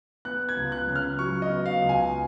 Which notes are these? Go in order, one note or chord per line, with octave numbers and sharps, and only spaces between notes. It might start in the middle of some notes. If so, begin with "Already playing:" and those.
B3 F#6
G#6
C#2
F#6
C#3
F6
F#3 C#6
D#5
B3
F5
C#2
G#5